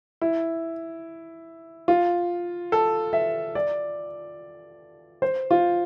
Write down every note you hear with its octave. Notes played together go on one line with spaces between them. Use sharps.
E4
F4
A4
E5
D5
C5
F4